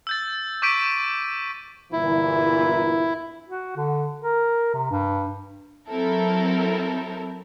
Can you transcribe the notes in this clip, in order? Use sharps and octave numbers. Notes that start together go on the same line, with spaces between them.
E6 G6 A6
C#6 D6 G6 B6 D7 D#7
G1 A#2 E3 E4
F#4
D3
A#4
C3
G2
F#3 C4 E4 A4 A#4